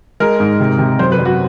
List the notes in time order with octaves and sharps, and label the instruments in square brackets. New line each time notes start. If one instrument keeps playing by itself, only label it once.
[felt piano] G#3 [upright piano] A#4
[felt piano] G#2
C3
C3
[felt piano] F#2 [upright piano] C5
[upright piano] B4
[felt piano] F#2
[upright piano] F#4